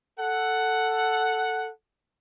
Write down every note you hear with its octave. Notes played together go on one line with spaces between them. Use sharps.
A4 F#5